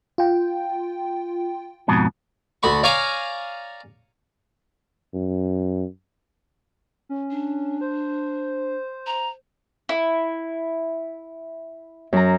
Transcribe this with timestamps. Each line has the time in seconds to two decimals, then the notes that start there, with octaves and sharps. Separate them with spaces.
0.18 F4 G5
1.88 F2 G#2 B2
2.63 D2 F#4 B5 C#6
2.83 C#5 D5 F5 G#5 A#5
5.14 F#2
7.09 C#4
7.31 D4
7.81 C5
9.06 A#5
9.89 E4
12.13 F#2 A#5